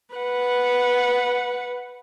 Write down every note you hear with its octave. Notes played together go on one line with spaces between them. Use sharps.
B4 F#5